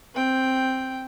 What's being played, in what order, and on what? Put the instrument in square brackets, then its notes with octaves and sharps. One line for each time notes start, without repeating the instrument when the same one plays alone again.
[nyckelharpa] C4 G5